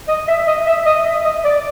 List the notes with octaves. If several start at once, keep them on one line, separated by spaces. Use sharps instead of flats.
D#5
E5
D#5
E5
D#5
E5
D#5
D5